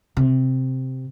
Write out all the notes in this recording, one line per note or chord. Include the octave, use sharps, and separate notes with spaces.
C3